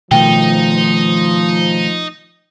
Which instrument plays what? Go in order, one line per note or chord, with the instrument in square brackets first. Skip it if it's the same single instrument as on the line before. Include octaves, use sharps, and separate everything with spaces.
[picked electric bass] B2 D#3 A3 [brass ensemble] F3 [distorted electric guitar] D#4 [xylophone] G5